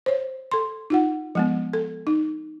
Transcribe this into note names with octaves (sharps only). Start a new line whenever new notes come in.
C5 C#5
A4 C6
D#4 F4 F#5
F3 G#3 B3
A4
D#4